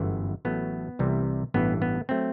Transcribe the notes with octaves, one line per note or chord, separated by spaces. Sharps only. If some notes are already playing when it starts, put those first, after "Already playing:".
Already playing: G1 F#2 E3 A3
A1 A2 F#3 A3 B3
C2 C3 E3 G3
A1 G2 E3 B3
B3
F#3 A3 C4